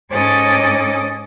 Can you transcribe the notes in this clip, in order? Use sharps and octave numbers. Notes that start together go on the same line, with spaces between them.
G#2 C#4 A4 D#5 D6 A6